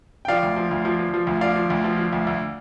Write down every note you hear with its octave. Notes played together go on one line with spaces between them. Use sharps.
G5
F3 D5 F5
D2
F3
D2
F3
F3
F3
D2
F3 D5 F5
F3
D2
F3
F3
D2
D2